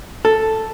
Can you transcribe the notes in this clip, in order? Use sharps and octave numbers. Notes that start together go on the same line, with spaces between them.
A4